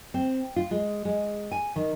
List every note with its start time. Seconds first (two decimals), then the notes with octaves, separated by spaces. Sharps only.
0.14 C4
0.56 F4
0.71 G#3
1.05 G#3
1.52 G#5
1.76 D#3